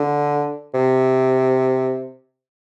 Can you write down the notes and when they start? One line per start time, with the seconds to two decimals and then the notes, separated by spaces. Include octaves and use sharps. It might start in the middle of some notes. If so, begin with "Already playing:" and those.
Already playing: D3
0.74 C3